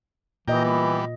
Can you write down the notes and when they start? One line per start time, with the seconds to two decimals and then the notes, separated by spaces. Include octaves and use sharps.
0.48 A#2 E3 G4 A#4 D#5 G5
0.64 G3 B3